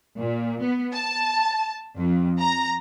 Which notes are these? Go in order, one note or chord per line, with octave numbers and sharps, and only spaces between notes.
A#2
B3
A5
F2
A#5